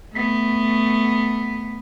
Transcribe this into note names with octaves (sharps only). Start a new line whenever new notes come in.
A3 B3